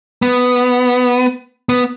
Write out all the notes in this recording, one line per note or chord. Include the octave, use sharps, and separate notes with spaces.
B3
B3